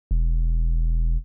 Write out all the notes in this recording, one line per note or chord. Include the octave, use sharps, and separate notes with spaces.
E1